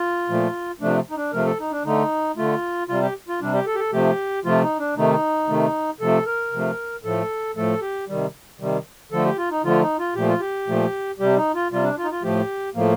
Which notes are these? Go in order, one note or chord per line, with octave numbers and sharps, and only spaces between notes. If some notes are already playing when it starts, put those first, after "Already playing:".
Already playing: F4
A#2 F3 A3
C3 F3 A3 D4
D#4
D4
C3 F3 A3 A#4
A4
D#4
D4
D3 A3 D#4
D3 A3 F4
C3 G3 F4
G4
F4
C3 G3 D4
G4
A4
G4
A4
C3 F3 A3 G4
C3 F3 A3 F4
D#4
D4
C3 D#3 A3 D#4
C3 D#3 A3
C3 F3 A3 A4
A#4
C3 F3 A3
A2 F3 A3 A4
A2 F3 A3 A4
G4
C3 D#3 G3
C3 D#3 G3
D3 F3 A3 A4
G4
F4
D#4
D3 F3 A3 F4
D#4
F4
A#2 F3 A3 G4
F4
G4
A#2 F3 A3
C3 G3 G4
D#4
F4
C3 G3 F4
D4
F4
D#4
F4
A2 F3 A3 G4
A2 F3 A3 A#3